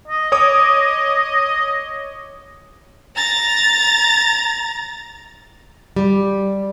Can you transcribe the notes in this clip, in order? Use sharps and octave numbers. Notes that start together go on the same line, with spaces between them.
D#5
C#5 D6 D#6
A#5 A6
G3